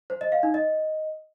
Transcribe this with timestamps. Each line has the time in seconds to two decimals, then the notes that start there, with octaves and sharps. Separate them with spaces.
0.10 C5
0.21 D#5
0.32 F5
0.43 D#4
0.54 D#5